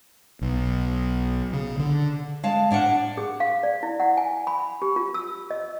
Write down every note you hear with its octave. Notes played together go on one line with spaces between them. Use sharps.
B1
C#3
D3
G#3 F5 A5
A2 D4 A#4 F#5
G#4
F5
D5
E4
F#5
G#5
B5
G4
F4
E6
D#5